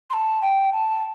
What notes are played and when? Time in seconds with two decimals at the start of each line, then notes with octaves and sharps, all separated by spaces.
0.10 C6
0.13 A5
0.42 G5
0.72 A5